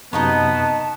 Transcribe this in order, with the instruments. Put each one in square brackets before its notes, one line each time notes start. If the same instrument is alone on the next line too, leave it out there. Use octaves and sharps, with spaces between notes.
[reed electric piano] F#2 C3 [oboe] B3 [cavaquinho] D#4 D#5 C#6 [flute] A5